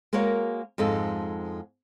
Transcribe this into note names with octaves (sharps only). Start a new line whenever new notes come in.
G#3 A#3 F#4 A#4 C#5
F2 G#2 G#3 A4